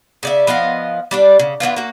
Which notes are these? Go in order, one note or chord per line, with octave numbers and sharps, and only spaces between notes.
C#3 D5 E5
F3 B3 D#5 F5
G3 D4 D5
C#3
E3 F#3 B3 F4
A#3 F#4